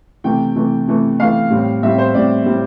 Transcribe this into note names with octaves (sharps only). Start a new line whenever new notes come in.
C3 E3 A3 G5
C3 E3 A3
C3 E3 A3
C3 E3 A3 F5
A2 G3 C4
A2 G3 C4 E5
C5
A2 G3 C4 D5
A2 G3 C4